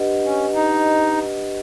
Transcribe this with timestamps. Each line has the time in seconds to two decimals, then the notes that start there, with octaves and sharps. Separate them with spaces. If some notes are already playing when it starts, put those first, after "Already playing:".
Already playing: D4 G4 B4 D#5 F#5
0.25 C#4
0.55 D#4